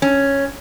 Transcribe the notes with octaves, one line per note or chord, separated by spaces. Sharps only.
C#4